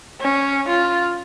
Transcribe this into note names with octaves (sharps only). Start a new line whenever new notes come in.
C#4
F4